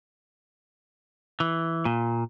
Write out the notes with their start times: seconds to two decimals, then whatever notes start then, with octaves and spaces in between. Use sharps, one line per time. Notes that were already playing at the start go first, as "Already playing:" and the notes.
1.40 E3
1.85 A#2